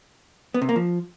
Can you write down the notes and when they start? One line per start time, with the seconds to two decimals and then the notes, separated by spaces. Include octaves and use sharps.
0.54 B3
0.62 C3
0.69 A#3
0.76 F3